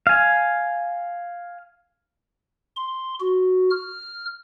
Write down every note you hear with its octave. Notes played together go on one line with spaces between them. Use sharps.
F5 G#5
C6
F#4
F6